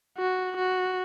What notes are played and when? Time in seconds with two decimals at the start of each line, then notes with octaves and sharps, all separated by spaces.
0.18 F#4
0.57 F#4